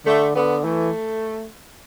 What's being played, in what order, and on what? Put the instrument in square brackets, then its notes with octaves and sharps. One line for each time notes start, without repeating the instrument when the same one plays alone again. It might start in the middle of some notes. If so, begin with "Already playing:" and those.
[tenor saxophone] D3 [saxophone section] A3
[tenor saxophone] D3 [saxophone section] B3
[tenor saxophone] E3 [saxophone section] A3